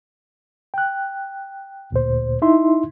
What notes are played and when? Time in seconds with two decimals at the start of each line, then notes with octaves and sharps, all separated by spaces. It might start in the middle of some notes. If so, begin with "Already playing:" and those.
0.74 G5 F#6
1.92 D2 A#2 C5
2.42 D#4 E4 E5 C6